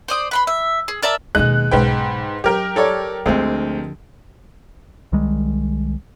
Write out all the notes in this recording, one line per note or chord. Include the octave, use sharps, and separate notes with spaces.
C5 D5 D#6
B4 B5 C6
E5
G#4
A#4 D5 E5 A5
D#2 B2 G#3 D#4 F#6
B1 G#2 B2 B4 G5
F#3 G4 A#4 G5
A4 C#5 D5
D2 D3 F3 G#3 C4
C2 D#3 G3 G#3